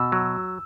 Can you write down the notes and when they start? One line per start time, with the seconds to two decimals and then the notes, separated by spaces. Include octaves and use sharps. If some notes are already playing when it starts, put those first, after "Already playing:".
Already playing: B2 E6
0.12 F#3